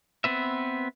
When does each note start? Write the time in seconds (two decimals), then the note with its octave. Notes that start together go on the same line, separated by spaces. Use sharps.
0.24 B3 C4 B4 E5